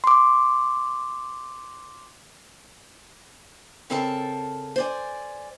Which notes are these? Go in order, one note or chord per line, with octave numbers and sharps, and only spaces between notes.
C6 D6
C#3 C4 A4 A#4 A5
C5 D5 G#5